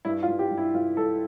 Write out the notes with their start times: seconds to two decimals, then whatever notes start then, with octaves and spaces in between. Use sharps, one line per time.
0.05 G2 E4
0.23 F4
0.28 G2
0.39 G4
0.51 G2
0.57 E4
0.74 G2 F4
0.97 G2 A4